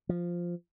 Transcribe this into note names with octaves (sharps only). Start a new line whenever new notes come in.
F3